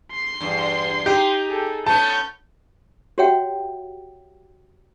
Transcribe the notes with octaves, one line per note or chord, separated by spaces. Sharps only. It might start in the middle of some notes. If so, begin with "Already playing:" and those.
C6 C7
E2 G2
D#4 G4
G#4 A4
A3 B3 C#4 A5 C#6 G6
F#4 G4 C#5 E5 F#5 G5